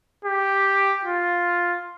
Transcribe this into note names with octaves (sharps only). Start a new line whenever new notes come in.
G4
F4